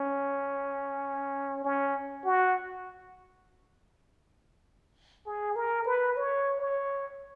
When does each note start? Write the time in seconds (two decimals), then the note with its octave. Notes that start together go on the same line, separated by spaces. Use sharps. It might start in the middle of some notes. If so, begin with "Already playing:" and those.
Already playing: C#4
1.65 C#4
2.25 F#4
5.26 G#4
5.56 A#4
5.86 B4
6.16 C#5
6.61 C#5